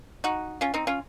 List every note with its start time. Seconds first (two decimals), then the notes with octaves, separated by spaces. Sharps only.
0.24 D#4 F#4
0.61 C#4 F4
0.74 C4 D#4
0.87 C#4 F4